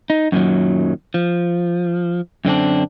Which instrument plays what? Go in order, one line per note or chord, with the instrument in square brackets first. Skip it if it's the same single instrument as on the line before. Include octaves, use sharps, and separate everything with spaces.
[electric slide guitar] D#4
F#2 A#2 D#3 F#3
F3
F#2 D3 C4 D4